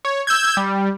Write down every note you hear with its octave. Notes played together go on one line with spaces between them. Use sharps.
C#5
E6 G6 G#6
G3